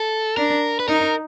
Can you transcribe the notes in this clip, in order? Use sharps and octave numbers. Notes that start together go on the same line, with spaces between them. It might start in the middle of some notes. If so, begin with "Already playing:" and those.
Already playing: A4
D4 A#4
B4
D#4 A#4